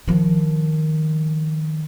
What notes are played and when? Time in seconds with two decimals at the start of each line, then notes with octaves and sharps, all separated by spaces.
0.08 D#3 F3